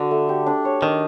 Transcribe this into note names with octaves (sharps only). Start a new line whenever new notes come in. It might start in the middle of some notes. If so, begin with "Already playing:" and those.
Already playing: D3 F#4
A3
G4
D4
C#5
D#3 D4